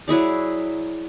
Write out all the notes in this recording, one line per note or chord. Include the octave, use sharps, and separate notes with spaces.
F#3 E4 G#4 D5